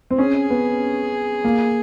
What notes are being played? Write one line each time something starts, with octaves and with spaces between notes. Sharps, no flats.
C4
C#4 G#4
B3
A#3